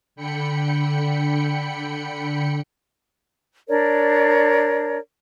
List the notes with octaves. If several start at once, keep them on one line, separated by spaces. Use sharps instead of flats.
D3 G5 B5 C#7
D4 A#4 C#5 D5